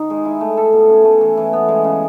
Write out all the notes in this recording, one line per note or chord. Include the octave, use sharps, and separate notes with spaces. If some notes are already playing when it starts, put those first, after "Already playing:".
Already playing: D#3 D#4
G#3
E4
A3
A4
B2
C#4
A3
E3
E3
B3
G#3
C#3